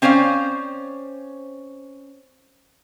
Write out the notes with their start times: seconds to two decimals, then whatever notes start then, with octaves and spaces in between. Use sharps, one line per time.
0.02 C4 C#4 C5 D5 F5